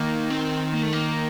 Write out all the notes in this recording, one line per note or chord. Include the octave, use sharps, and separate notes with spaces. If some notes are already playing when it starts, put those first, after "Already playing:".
Already playing: D#3 A#3
C4
A#3
A3
A#3